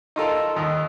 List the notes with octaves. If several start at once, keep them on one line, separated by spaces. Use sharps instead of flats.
D#4 F4 A4 A#4
D#2 D#5